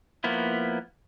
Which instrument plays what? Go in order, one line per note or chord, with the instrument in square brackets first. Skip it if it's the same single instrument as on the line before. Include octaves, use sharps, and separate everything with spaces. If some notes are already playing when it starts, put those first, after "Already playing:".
[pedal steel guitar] F3 A#3 B3 E4